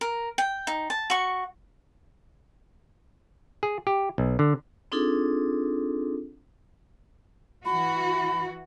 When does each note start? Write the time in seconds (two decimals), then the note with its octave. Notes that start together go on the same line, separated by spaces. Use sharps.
0.01 A#4
0.38 G5
0.67 D#4
0.90 A5
1.10 F#4 C#6
3.63 G#4
3.87 G4
4.18 B1
4.39 D3
4.92 C4 D4 D#4 F4 G#4 A4
7.65 E3 F#4 B5